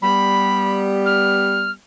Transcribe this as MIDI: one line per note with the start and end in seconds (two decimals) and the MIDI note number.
0.02 1.74 55
0.02 1.74 59
0.02 0.79 83
1.05 1.70 89